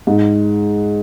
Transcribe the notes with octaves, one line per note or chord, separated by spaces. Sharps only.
G#2